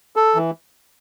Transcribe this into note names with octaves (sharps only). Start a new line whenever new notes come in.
A4
E3